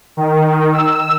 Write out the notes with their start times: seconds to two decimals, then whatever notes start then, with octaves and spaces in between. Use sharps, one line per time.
0.17 D#3
0.73 E6